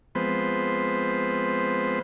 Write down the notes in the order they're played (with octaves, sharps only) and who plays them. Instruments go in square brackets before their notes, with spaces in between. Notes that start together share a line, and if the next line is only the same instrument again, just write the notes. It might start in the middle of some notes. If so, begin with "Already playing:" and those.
[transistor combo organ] F3 G#3 B3 C4 B4 C5